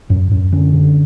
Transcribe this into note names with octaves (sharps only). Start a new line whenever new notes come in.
F#2
F#2
D3 C#4
D3